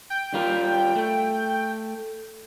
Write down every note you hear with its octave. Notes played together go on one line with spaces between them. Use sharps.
G5
G3 F4 A#4
A3